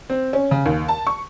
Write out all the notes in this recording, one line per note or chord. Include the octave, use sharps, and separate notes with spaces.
C4
C#4
C#3
D#2
A5
C#6